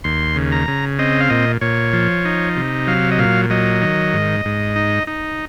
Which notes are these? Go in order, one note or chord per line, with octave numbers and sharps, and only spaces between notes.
D#2 C6
C#3
A#5
C#3
C4 D#5
F5
A#2 D#5
A#2 C#5
F3
D#4
C3
F#3 F5
D#5
A#2 F5
F#3 D#5
D#3
G#2
G#2
D#4
D#4